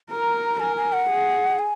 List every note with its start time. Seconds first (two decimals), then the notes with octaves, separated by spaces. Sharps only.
0.10 A#4 A#5
0.60 A#4 G#5
0.77 G#5
0.93 F#5
1.10 G#4
1.59 G#5